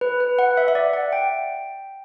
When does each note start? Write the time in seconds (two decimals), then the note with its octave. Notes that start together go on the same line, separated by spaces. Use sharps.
0.01 B4
0.20 B4
0.39 F#5
0.57 E5
0.68 E5
0.75 D5
0.93 F#5
1.13 G5